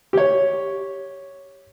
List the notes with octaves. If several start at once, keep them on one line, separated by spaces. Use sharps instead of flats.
G4 C#5